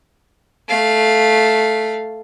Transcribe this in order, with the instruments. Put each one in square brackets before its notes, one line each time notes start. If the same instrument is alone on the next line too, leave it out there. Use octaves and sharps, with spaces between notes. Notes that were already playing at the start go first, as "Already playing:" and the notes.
[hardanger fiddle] A3 F5